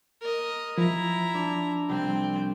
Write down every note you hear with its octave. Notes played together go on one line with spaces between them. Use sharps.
A#4 D#5
F3 E4 A#5
D4
C2 C4 G5